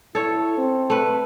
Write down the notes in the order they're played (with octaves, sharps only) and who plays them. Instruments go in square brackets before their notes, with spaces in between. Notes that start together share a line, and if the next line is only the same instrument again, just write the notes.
[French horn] E4 [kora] A4 C#5
[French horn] C4
[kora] A3 B4